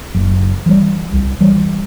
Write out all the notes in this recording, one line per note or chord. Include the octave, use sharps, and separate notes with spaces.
F#1
E3 G3
C2
E3 G3